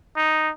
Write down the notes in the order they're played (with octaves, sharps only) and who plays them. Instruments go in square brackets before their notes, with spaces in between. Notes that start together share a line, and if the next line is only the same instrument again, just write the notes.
[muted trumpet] D#4